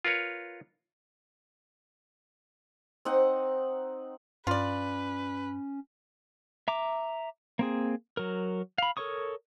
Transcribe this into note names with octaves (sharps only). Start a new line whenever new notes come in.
F4 A#4 B4 C#5
C4 D#4 F#5
G2 C#4 F4 B4 D5
E5 A#5 D6
A#3 C4 G#4
F#3 A#4
F5 B5
A4 A#4 C#5 C#6 D#6